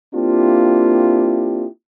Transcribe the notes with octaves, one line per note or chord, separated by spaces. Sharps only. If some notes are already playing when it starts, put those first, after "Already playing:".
A#3 C4 D4 E4 F4 G4